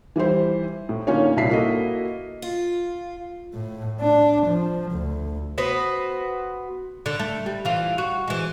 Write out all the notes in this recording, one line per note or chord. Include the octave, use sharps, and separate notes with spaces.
E3 G3 E4 C5
A2
D3 A#3 C#4 D#4 F4 C#5
C2 A#2 D4 E4 B6 C7
A#3 E4 F#4 A4 D#5
F4
A2
D4
F3
D2
B3 F#4 B4 C5
D3
A3
G3
E3 F4
F#4
E3 G#3